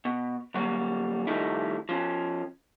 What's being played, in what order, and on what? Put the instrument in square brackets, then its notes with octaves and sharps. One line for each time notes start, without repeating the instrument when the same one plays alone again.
[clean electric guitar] B2
D3 F#3 G3 A#3
D#3 F3 G3 A3 D#4 E4
F3 C#4